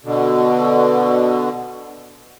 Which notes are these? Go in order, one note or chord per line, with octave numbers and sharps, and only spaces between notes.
B2 D3